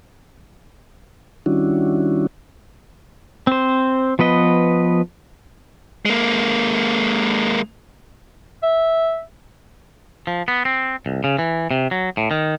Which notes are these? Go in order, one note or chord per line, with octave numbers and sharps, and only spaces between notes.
D#3 G3 C#4 D4 E4 F#4
C4 C5
F3 B3 B4 D#5
G#3 A#3
E5
F3
B3
C4
C2
C#3
E3
C3
F#3
A2
D#3